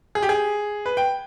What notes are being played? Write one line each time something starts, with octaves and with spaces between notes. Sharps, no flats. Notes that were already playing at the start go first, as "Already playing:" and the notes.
G#4
G4
G#4
B4
G5